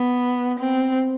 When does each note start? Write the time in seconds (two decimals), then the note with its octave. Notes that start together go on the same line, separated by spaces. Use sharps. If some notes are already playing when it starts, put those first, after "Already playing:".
Already playing: B3
0.59 C4